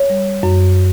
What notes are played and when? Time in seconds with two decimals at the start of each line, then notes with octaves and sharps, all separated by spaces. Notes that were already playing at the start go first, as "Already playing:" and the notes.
Already playing: C#5
0.10 G3
0.43 F#2